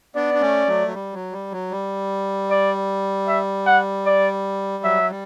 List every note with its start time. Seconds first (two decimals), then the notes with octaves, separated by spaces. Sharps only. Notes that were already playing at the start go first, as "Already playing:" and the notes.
0.15 B3 D4 D5
0.34 D4
0.41 A3 C#4
0.67 F#3 A3
0.88 F#3
0.94 G3
1.14 F#3
1.32 G3
1.52 F#3
1.71 G3
2.50 D5
3.28 E5
3.66 F#5
4.05 D5
4.84 F#3 E5
5.10 G3